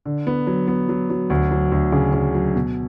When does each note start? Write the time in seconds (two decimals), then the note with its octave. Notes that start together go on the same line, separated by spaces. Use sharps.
0.06 D3
0.27 B3
0.47 F#3
0.68 B3
0.89 F#3
1.10 F#3
1.30 D2
1.51 F#3
1.72 D2
1.92 C#3
2.13 C#3
2.35 F#3
2.55 B2